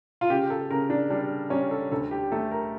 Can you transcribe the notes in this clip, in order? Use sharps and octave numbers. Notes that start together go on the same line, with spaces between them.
F4
C#3 G4
A4
C#3 A#4
D4
G3 D4
G3 C#4
A4
D2 A4
G4
A3 A4
A#4